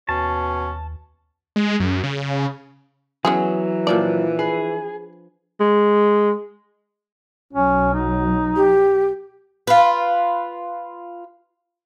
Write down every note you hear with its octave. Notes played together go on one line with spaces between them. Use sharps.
D#2 B2 C#4 A5
G#3
F#2
C#3
E3 F#3 B3 C#4 G#4
A#2 F3 D4 D5
G#4 B4
G#3
B1 F#3 C#4
D#4
G4
F4 B4